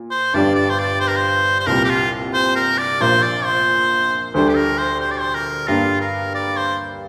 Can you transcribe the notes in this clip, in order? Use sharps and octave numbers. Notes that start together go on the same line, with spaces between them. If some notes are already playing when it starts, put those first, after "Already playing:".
Already playing: A#2
C5
G1 G2 G3 D4 D5
D5
C5
D5
C5
A#4
C5
C5
C2 A#2 G3 A#4
G4
F4
C5
A#4
D5
A#1 A#2 A#3 C5
D5
C5
D2 D3 G3 D4 C5
G4
A#4
C5
C5
D5
C5
A#4
G2 G3 A#3 D4 F4
A#4
D5
C5